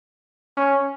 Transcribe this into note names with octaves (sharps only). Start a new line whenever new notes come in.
C#4